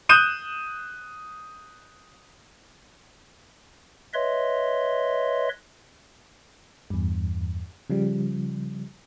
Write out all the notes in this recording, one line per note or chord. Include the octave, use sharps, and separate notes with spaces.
D#6 F#6 G6 D#7 E7
B4 C#5 D#5 E5 C6
E2 G2
C#3 F3 G3